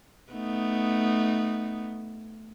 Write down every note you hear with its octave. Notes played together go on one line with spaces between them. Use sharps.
A3 B3 D#4